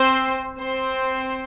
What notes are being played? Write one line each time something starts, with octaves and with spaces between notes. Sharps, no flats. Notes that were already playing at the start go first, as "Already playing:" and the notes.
Already playing: C4 C5
C4 C5